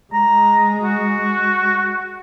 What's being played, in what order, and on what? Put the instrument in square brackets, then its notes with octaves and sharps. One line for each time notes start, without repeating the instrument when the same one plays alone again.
[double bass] G#3 [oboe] A#5
[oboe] F#4